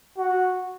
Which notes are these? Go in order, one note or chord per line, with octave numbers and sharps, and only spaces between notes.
F#4